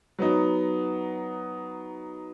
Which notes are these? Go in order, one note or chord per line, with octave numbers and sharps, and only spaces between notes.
F#3 B3 D#4